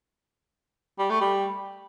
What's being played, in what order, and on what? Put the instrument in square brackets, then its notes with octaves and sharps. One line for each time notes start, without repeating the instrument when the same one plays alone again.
[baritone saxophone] G3
A3
G3